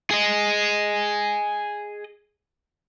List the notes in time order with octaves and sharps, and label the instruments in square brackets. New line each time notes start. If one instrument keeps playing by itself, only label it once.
[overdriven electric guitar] G#4 D#5